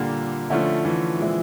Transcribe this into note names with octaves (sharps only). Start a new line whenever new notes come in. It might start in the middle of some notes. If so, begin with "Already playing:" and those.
Already playing: A#2 D3 G3 A#3
D3 F3 A3 C#4 E4
E3
A#2 F3 G#3 C4 E4